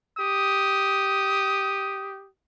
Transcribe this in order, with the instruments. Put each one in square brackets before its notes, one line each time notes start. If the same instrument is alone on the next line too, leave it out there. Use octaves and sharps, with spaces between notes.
[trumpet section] G4 D#6